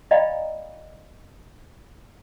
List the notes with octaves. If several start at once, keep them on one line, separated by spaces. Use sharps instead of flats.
D5 D#5 F5 G5 A#5 B5